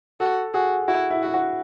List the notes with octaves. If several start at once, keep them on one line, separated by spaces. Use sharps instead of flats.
F#4 A4
F#4 G#4
E4 F#4
E4
E4 F#4
F#4